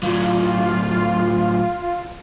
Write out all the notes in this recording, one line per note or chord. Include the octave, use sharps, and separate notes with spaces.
A2 F#3 F4